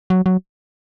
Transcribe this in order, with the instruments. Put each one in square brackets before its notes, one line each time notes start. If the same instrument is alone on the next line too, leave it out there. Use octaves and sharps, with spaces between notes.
[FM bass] F#3
F#3